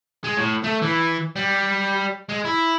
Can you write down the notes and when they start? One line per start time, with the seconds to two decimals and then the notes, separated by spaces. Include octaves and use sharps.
0.24 G#3
0.37 A2
0.64 A3
0.82 E3
1.36 G3
2.29 G#3
2.45 E4